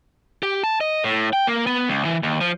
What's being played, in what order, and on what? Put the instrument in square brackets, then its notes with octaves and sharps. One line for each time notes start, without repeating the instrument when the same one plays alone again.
[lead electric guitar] G4
A5
D#5
A2
G5
A#3
B3
C#2
E3
D#2
F3